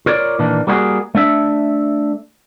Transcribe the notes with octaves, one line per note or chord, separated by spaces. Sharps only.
F4 A#4 C#5 D5
A#2 D#3 E3 A#3 D4
G3 A#3 C4 F4 F#4 G#4
A3 D4 E5